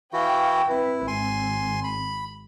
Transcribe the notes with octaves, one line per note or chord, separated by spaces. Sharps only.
E3 E4 F#4 F5 G5
C4 E4 B4
G#1 G#5 C6
B5